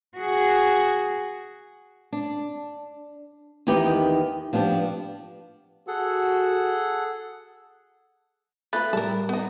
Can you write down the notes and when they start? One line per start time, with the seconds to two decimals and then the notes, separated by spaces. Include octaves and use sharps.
0.17 F#4 G#4
2.12 D4
3.67 E2 D#3 D#4 G4 B4
4.53 F3 B3 D4 G4
5.88 F#4 G#4 A4 F#5
8.73 A3 F4 B4 B5 F#6 A6
8.93 A2 G3 A4 A#4
9.29 B3 D#4